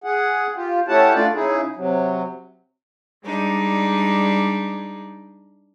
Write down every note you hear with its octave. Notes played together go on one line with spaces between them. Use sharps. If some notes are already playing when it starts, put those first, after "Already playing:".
G#4 F#5
F4 G4
A3 C#4 E4 G4 F#5 A5
A3 D4 F4 D5
C#3 D#4 E4 G#4
C3 F#3
G3 G#3 D4 D#4